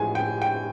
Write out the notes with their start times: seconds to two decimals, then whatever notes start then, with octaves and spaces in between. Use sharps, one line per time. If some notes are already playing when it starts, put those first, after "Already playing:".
Already playing: A2 F3 G#3 G#5
0.15 G5
0.42 G5